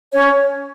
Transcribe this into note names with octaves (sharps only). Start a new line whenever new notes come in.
C#4 C#5